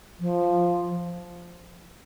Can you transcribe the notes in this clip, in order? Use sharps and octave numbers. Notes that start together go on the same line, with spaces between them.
F3